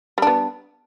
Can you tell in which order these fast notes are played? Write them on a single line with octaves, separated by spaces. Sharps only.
G3 D4 B3